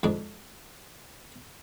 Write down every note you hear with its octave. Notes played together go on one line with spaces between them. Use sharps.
F2 G#2 D4